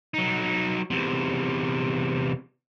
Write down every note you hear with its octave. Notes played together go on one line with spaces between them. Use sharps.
F#3 D#4
E2 C3